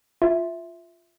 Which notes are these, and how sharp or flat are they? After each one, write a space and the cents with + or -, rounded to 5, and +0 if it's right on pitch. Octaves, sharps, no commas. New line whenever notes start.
F4 +0 E5 +0